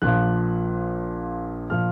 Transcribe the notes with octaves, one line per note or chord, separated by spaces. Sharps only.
A#1 A#2 F3 F#6
A#2 F3 F6